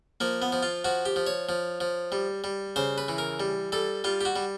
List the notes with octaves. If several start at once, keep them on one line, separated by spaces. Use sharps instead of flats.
F3 A#3
B3
F3
F4
F3 F#4
G4
F3
C#5
F3
F3
G3
G3
C#3 C5
B4
E3
A#4
G3
G3 A4
G3 F4
G4
F#4
G3